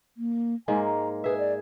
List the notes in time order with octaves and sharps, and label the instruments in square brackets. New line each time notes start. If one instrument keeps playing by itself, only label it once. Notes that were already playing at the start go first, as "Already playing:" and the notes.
[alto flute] A#3
[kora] G#2 G#3 A#3 [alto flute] G#5
[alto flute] A#5
[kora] G#4 E5 [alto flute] B4
[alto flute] D5